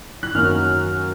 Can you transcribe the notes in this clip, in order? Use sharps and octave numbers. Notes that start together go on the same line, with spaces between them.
F#6
F#2 D#3 F#3 A#3 C#4 F6